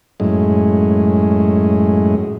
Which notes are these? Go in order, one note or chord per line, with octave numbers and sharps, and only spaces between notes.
F#2 A2 G#3